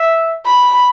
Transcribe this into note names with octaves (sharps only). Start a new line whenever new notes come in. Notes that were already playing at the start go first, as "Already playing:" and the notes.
Already playing: E5
B5